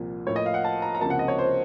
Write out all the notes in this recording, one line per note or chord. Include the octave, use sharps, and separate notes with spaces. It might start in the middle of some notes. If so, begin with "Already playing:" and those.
Already playing: C2 A#2 F3 A#3
A2 F3 A#3 C#5
D#5
F5
F#5
A5
A#5
A#5
C#2 C3 F3 A#3 A5
F#5
D#5
C#5
C5